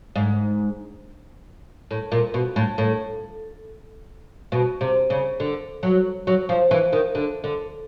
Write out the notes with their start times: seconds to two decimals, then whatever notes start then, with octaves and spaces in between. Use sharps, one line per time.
0.16 G#2
1.91 A2
2.12 A#2
2.34 B2
2.56 A2
2.78 A2
4.52 B2
4.81 C3
5.10 C#3
5.40 D3
5.83 F#3
6.27 F#3
6.49 F3
6.71 E3
6.93 D#3
7.15 D3
7.44 D3